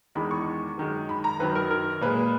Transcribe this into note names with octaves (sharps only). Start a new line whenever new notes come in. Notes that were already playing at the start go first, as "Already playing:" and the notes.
E2 D#3 G#3 B5
C#6
F#2 D#3 G#3
B5
A#5
F#2 D#3 F#3 B4
A#4
A#4
A#2 G#3 B4